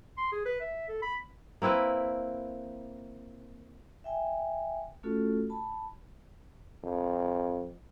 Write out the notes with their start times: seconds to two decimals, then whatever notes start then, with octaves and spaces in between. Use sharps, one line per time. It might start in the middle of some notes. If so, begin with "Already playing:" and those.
0.17 C6
0.32 G#4
0.46 B4
0.60 E5
0.89 A4
1.02 B5
1.62 A#3 C4 E4 B4
4.04 E5 G5 G#5
5.03 A3 C#4 F4 F#4 A4
5.49 A5 B5
6.83 F2